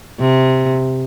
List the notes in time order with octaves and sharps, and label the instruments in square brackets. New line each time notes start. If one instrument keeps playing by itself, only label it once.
[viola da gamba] C3